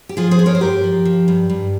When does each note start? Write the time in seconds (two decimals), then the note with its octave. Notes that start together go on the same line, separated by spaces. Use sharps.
0.09 G4
0.17 F3 F4 G#4
0.31 G#4 C5
0.39 G2
0.46 A#4 C#5
0.55 C5
0.61 G2 G4 A#4
0.84 F3
1.05 F3
1.28 G2
1.50 G2